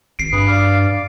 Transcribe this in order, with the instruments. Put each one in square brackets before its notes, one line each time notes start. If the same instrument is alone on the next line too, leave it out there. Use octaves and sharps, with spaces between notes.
[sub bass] G#1 [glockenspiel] C7 D7
[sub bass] G2 [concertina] G#4 B4
[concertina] D5 F5
D5